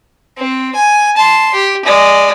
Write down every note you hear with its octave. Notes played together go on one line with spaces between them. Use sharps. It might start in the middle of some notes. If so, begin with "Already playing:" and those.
C4
G#5
A5 C6
G4
G#3 D5